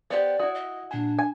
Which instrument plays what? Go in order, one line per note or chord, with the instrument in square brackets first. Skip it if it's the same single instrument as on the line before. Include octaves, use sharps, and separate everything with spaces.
[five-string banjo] B3 G4 [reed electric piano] C5 [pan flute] D5
[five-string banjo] E4 F#4 [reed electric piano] D#6
[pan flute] D#5
[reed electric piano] A#2 G#5 [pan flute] D4
[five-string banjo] G#5